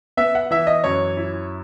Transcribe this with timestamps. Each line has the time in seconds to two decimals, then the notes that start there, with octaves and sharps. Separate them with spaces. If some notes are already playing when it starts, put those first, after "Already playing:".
0.17 B3 E5
0.35 F#5
0.51 E3 E5
0.67 D#5
0.84 F#2 C#5
1.17 E4